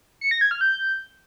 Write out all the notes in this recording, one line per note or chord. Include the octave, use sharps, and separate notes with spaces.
C#7
A#6
G#6
F6
G6